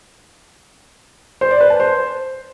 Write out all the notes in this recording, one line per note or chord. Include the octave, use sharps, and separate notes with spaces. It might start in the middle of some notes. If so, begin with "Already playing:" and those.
C5
D5
B4
A5
C5